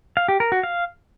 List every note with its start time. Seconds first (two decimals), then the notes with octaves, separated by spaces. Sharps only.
0.17 F5
0.28 G4
0.40 A#4
0.52 F#4
0.63 F5